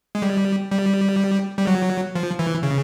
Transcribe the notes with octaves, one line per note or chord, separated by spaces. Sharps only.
G#3
G3
G3
G3
F#3
F3
E3
C#3